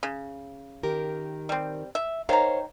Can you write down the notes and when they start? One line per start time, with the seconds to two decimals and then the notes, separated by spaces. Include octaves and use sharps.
0.03 C#3
0.83 D#3 G4 A#4
1.49 G3 C4
1.95 E5
2.29 D#3 C5 C#5 F5 A#5